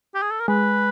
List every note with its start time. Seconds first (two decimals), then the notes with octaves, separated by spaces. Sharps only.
0.14 G4
0.22 G#4
0.31 A4
0.40 A#4
0.48 G#3 B4